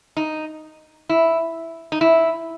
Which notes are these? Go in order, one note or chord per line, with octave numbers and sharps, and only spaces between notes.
D#4
E4
D#4
E4